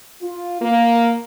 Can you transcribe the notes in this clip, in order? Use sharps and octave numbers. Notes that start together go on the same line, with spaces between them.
F4
A#3